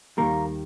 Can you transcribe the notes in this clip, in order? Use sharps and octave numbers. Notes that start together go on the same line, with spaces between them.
D#2 D#3 G3 A#3 A#4